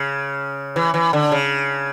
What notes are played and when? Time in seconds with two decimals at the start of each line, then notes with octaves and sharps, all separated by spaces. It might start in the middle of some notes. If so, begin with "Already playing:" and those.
Already playing: C#3
0.76 E3
0.94 E3
1.13 D3
1.32 C#3